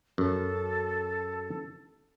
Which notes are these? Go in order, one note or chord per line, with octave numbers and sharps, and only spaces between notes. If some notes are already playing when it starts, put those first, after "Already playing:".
F#2 A4